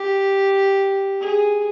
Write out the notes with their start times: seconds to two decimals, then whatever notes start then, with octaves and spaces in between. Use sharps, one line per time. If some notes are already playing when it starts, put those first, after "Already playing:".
Already playing: G4
1.21 G#4